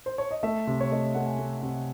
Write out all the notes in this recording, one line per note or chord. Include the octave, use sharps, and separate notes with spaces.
C5
C#5
D#5
A3 E5
C3
C#5
A3 D#5
A3 F#5
G#5
A3
C3